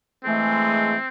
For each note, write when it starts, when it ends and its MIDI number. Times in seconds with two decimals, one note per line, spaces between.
0.24 0.95 52
0.24 0.95 56
0.24 0.97 57
0.24 1.08 60